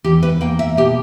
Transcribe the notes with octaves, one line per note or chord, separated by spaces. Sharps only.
E2 G4
B4
A#3 G5
E5
B2 G4